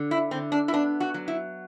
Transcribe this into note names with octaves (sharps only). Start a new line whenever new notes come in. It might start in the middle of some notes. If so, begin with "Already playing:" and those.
Already playing: D3
E4
D3 C4
D4
E4
B3 D4
F#4
F#3
E4